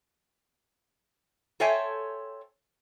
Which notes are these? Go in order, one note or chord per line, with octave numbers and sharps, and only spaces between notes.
A4 C5 C#5 E5 G5 G#5